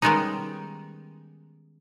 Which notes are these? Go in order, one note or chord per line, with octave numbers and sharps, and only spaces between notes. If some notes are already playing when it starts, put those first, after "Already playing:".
D#3 G3 G#3 B3 C#4 D#4